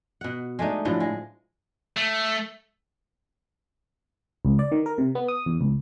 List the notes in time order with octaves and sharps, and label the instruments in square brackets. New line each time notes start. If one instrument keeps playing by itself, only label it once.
[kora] B2 F#5
G#3 A3 D4 D#4
A2 D3 F3 F#3
G#3
[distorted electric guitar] A3
[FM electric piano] C#2
D5
D#3
A#4
C3
B3
D#6
E2
C#2